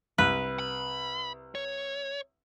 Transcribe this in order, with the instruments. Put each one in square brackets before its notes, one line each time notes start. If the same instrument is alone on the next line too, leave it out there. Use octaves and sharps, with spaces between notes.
[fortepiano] C2 [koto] B4
[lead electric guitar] B5
C#5